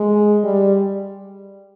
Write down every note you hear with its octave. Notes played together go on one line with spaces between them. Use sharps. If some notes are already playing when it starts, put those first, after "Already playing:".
Already playing: G#3
G3